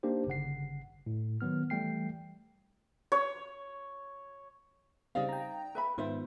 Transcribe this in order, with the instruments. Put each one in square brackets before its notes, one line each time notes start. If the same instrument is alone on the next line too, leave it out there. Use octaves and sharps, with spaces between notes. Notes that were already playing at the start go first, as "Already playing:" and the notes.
[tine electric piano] A#3 D4 D#4 G4 C5
G1 C#3 F#5 C7
A2
D#3 F#3 B3 F6
E3 G3 A3 G5 C7
[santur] C#5
[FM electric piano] C#3 G3 C4 [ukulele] D#4 D5 F5
[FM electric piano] G5 A#5
[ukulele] B4 E5 B5
[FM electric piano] G#2 D#3 B3 [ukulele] F4 C5 E5